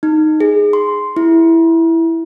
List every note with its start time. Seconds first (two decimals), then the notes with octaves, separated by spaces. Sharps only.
0.03 D#4
0.40 G#4
0.73 C6
1.16 E4